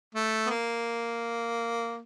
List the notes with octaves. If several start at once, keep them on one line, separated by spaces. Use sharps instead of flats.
A3
B3
A#3